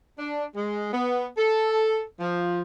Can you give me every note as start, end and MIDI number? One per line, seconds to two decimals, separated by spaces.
0.19 0.44 62
0.55 0.91 56
0.93 1.27 59
1.37 2.03 69
2.20 2.61 53